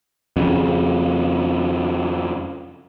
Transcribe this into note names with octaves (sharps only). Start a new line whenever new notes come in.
F2 C#3